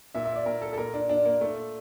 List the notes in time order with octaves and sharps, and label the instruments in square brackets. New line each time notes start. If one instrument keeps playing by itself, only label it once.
[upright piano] A#2 E5
E5
D5
A#2 A#4
A4
A4
A#2 A#4
D4
A#2 D4
A#3
A#2 A3